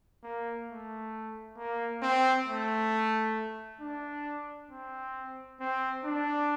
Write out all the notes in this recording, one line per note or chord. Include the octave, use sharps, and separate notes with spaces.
A#3
A3
A#3
C4
A3
D4
C4
C4
D4